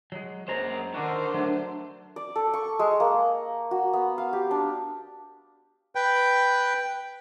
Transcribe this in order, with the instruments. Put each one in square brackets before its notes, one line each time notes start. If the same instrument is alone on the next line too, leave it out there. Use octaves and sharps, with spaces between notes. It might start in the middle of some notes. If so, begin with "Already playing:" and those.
[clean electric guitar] F#3 G#3
[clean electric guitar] F#2 G#3 A#5 [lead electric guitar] A#3 C5
[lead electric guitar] D3 [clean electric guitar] D#3 D4 F#4 [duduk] A#4 [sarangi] C5
[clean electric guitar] F#3 A3 [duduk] D4
[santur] D5
A4
C#6
G#3
A#3
F#4
B3
F5
G4
D4
[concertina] B4 G5